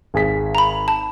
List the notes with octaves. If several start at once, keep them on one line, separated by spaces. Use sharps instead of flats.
G#1 G#4 B6
A#5 B5
A5